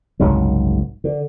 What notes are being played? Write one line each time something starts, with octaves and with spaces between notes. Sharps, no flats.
F#1 C2 G#2 F#3
D3